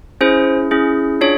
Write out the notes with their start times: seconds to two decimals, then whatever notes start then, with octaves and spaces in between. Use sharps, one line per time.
0.21 C#4 E4 G#4 C5
0.71 C#4 E4 G#4
1.21 D4 F4 G#4 C#5